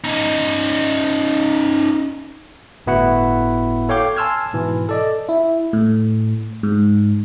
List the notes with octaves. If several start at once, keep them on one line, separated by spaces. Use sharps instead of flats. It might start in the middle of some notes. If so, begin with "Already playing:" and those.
C#4 D#4
G1 A2 B3 E4 F#4 F#5
A4 C#5 F5 G5 D6 G6
G#5 A5 C6 E6 F6 G#6
G#2 B2 E3
A4 D5 D#5
E4
A2
G#2